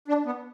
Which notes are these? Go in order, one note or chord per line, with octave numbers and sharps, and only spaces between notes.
D4
B3